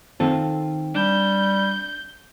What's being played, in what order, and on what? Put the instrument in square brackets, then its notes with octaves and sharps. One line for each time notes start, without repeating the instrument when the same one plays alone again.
[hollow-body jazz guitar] D#3 F4 A4 [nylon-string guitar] C4
[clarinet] G3 [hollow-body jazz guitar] D4 [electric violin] G6